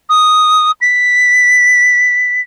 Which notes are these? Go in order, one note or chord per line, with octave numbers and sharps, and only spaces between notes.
D#6
B6